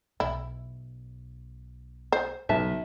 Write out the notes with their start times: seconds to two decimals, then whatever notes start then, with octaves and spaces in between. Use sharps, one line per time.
0.20 B1 E4
2.12 C5
2.49 B1 C#3 E5 A5